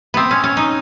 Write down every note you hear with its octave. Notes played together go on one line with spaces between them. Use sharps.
B3 C4
C#4
C#4
D#4